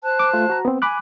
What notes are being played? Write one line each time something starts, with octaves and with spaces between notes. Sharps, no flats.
C5 A5 F#6
D6
A3 F4
F#4 A#5
B3 C4
G#5 B5 D6 F#6